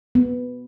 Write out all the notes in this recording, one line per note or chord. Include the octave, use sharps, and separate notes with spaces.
B3